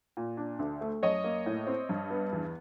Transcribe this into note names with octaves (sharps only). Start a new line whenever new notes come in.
A#2
D4
D2
A3
F#2 C#5 D#5
A#3
A2
C4
G2
B3
E2